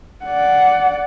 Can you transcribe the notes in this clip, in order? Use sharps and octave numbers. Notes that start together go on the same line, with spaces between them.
D5 F#5